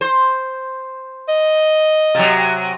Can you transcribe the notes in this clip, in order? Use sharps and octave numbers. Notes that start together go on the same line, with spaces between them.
C5
D#5
C3 F#3